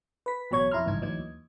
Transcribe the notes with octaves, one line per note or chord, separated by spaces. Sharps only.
B4 B6
A1 B2 F#3 C#5 C#6 G#6
F2 E4 A#5 C6 F6
G#1 C#2 G2 E3 D#4 G#6
D2 E3 F#3 D#4 G#6
D#2